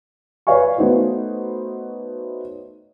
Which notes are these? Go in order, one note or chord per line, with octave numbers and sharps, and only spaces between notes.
B4 C#5 D5 F5 G#5 C#6
A3 B3 D#4 F#4 C5 C#5